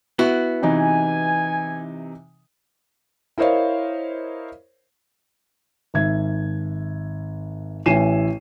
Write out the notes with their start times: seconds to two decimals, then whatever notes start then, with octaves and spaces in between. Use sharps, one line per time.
0.19 B3 E4 F#4
0.62 C3 E3 D#4 G#5
3.38 E4 A#4 C5 C#5 D#5 F5
5.94 G#1 E5 G#6
7.86 A1 E4 G#5 C7 D#7 E7